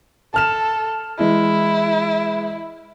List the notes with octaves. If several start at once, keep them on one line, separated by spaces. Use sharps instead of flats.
A4 A5 F6 E7
E3 G#3 E4